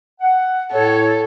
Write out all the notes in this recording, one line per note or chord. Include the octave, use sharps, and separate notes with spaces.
F#5
A2 A4 C#5